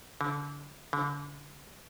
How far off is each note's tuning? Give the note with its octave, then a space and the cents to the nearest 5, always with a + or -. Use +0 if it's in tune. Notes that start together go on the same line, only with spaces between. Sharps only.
D3 -35
D3 -40